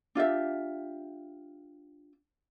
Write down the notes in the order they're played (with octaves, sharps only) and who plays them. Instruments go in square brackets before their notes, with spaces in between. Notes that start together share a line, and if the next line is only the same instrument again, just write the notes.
[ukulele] D4 F4 G4 E5